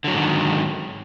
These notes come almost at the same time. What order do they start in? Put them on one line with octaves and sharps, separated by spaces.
D3 F#3 F2 G#2 D#3